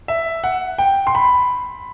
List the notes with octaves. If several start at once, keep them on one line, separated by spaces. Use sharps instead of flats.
E5
F#5
G5
C6
B5